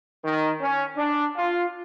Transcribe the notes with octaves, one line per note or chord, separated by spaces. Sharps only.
D#3
C#4
D4
F4